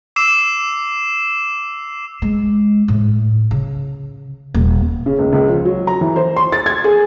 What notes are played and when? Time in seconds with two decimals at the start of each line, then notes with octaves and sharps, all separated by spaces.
0.16 D6 E6 C7 E7
2.22 G#3
2.88 A2
3.51 C#3
4.54 D#1
5.06 C#3
5.19 C#2
5.33 C#2
5.48 F3
5.65 F#3
5.87 A#5
6.01 E3
6.16 C5
6.36 C6
6.52 A6
6.66 G#6
6.84 G#4